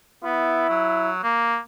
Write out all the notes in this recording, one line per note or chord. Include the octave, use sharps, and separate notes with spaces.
B3 E4
F#3
A#3